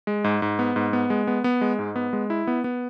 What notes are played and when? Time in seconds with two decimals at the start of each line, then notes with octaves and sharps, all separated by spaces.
0.07 G#3
0.24 G#2
0.42 G#2
0.59 B3
0.76 G#2
0.93 B3
1.10 G#3
1.27 B3
1.44 B3
1.61 G#3
1.79 G#2
1.96 B3
2.13 G#3
2.30 E4
2.47 B3
2.64 B3